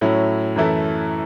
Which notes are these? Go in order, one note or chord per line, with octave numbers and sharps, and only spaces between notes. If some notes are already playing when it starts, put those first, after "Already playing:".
A2 F#3 C#4 E4
F#2 E3 A3 E4